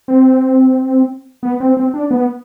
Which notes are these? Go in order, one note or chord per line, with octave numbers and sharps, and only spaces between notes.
C4
B3
C4
C4
D4
B3